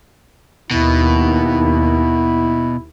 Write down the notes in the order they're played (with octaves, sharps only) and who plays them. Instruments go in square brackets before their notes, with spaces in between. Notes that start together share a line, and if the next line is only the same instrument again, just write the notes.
[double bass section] D#2 [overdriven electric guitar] B2 [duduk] E4